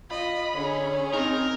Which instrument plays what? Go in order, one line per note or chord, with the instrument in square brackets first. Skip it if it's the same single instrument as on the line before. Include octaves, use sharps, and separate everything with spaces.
[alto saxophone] F4 [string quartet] D#5 [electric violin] B5
[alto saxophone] D3 [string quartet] C#4 G#4
[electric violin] C4 [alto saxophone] D#4 [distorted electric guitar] A#4 A#5